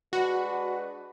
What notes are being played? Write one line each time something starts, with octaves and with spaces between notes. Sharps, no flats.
G#3 D4 F#4 B4